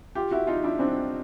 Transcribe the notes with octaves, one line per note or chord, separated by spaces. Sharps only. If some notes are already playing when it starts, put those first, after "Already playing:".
F4 G4
E4 F#4
D#4 F4
D4 E4
C4 D4